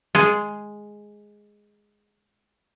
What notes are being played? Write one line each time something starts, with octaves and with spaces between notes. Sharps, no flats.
G#3 G#4